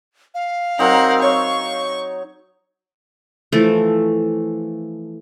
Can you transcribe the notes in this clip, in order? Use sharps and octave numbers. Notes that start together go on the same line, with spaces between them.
F5
F#3 C4 D#4 A#4 F#5
C#5 C#6
E3 F3 A3